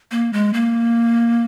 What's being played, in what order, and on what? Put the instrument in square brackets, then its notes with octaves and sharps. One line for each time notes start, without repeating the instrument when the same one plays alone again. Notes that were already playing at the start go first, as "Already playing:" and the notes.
[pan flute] A#3
G#3
A#3